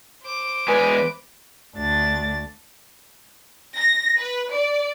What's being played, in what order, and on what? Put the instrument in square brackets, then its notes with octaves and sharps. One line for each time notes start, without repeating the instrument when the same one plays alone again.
[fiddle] C5 D6
[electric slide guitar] E2 G#3 G#5 [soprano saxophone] B4
[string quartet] D2 D4 A6
[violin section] A#6
B4
D5